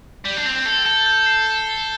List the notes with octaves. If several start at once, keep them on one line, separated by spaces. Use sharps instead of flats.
G3 G6
D4
C4 F7
A4 G6
A4 G6
G6
C7
G7
G7